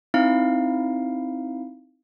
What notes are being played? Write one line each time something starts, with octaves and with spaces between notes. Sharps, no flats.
C4 D#4 E4 F5